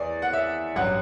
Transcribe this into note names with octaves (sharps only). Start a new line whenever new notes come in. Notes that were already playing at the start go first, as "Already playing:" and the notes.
Already playing: E2 D5
F#5
E5
A1 G2 F#3 F#5